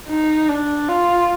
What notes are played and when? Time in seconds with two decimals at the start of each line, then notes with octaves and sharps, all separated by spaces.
0.09 D#4
0.49 D4
0.88 F4